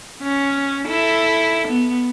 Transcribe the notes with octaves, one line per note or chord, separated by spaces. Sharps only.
C#4
E4 A4
B3